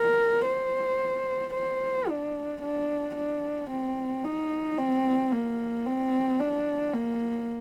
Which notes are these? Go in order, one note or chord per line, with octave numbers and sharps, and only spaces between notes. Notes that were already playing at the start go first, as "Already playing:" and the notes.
Already playing: A#4
C5
C5
D4
D4
D4
C4
D#4
C4
A#3
C4
D4
A#3